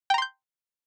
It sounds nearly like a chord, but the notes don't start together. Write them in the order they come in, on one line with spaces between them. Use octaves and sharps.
G5 A#5 C6 G6